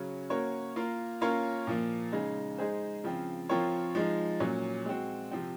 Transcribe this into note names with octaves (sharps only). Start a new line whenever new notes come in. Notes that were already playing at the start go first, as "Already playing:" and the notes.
Already playing: C#3 F#3 C#4
A#3 C#4 F#4 A#4 C#5
A#3 F4 A#4
A#3 C#4 F4 A#4 C#5
A#2 F3 A#3
C#3 G#3 D#4
G#3 D#4 G#4 C5
C#3 F3 C4
F3 C4 F4 A#4 C#5
F3 G#3 D#4
A#2 F#3 C#4
G#3 C4 F#4
C3 F3 C4